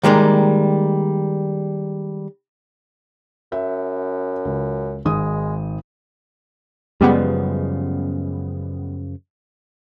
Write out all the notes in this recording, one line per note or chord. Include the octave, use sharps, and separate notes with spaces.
D#3 G3 G#3 A#3
F#2 E5
C#2
G#1 G#2 G#3 D#6
F#2 C#3 F3 G3 G#3 B3